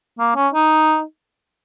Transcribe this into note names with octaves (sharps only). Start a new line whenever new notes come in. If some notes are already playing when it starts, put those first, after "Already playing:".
A#3
C#4
D#4